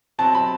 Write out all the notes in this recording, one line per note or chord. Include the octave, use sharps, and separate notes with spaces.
B2 F#3 C4 A5
B5